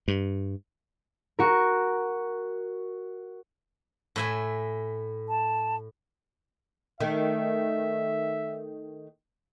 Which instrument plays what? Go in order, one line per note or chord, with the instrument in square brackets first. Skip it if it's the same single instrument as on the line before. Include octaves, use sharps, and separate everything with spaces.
[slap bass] G2
[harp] F#4 A#4
[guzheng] A2 E5 G#5
[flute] A5
[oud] D#3 A3 [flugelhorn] E5